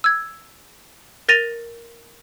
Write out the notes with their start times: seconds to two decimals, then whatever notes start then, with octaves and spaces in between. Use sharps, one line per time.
0.04 E6 G#6
1.29 A#4 A6 A#6 D#7 F7